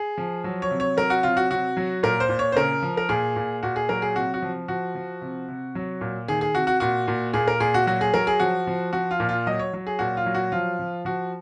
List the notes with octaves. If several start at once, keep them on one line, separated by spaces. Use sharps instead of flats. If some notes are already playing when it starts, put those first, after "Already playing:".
Already playing: G#4
F3
F#3
C#5
C3
C#5
F#3 A#4
F#4
C3 F4
F#4
C3 F#4
F#3
A#2 A#4
C5
A#2
C#5
C5
C#3 A#4
F3
A#4
A#2 G#4
A#2
A#2 F#4
G#4
F#3 A#4
G#4
C3 F#4
F#4
F3
F3 F#4
F3
C3
C3
F#3
A#2
D#3 G#4
G#4
C3 F#4
F#4
A#2 F#4
A#2
A#2 G#4
A#4
A#2 G#4
F#4
F#3 F#4
G#4
F#3 A#4
G#4
F3 F#4
F3
F3 F#4
F4
A#2
F4
F#3 D#5
C#5
F#3
G#4
A#2 F#4
F4
F#3
F#4
F3 F4
F3
F3 F#4